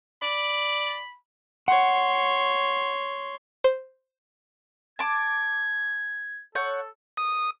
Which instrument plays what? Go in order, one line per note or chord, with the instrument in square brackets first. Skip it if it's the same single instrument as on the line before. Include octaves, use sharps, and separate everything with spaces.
[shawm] D5 [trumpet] B5
[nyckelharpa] C#5 C6 [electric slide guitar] F#5
[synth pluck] C5
[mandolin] A5 D6 [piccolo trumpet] G#6
[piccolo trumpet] A4 [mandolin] C#5 F#5 G6
[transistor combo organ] D#6